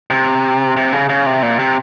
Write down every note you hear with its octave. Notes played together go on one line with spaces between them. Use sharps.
C3
C3
C#3
C#3
C3
A#2
C3